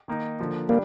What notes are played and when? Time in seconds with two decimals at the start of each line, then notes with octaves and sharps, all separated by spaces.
0.08 D#3 A#3 D#4
0.39 D3 F3 A#3
0.69 G3 A#3 D4